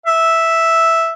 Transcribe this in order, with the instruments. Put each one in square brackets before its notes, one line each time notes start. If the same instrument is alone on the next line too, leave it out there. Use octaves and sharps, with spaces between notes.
[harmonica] E5